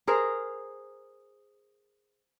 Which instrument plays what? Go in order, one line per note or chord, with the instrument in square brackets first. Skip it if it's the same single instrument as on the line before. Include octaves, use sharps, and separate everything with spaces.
[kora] G#4 A#4 C5